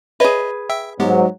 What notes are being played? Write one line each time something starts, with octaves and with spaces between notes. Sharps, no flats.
G#4 B4 C#5 D#5 E5
E5 G5 E6
G#2 F#3 G#3 B3 G4